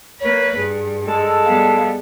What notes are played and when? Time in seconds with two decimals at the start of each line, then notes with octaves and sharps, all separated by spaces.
0.21 A#3 B4 C#5
0.56 G2 G#4
1.07 G#3 A4
1.46 G3 B3 F5